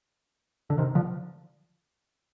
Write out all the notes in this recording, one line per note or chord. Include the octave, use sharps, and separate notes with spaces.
D3
C3 D#3
D3 F3